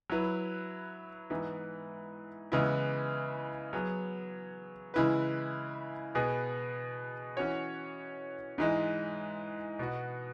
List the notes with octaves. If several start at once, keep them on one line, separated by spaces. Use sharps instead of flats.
F#3 E4 B4
G#2 E3 B3 E4
C#3 E3 G#3 B3 E4
F#3 B3 G#4
C#3 E3 G#3 E4 B4
B2 B3 G#4
E3 C#4 F#4 C#5
G#2 E3 G#3
B2 B3 F#4